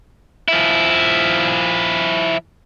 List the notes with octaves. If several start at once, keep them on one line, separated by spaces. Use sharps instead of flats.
F3 E4